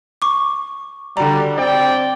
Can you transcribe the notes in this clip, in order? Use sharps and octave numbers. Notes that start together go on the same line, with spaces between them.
C#6 D6
D3 G3 F#4 D5 A#5
C4 D5 G5